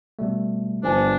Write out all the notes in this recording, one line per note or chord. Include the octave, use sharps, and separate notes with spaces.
B2 G3 A3
G1 F3 D4 C5 G#5 A5